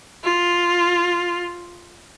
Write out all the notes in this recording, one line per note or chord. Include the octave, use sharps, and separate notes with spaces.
F4